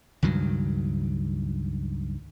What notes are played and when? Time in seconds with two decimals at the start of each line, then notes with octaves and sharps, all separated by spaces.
0.23 C#2 G2 D#3 F#3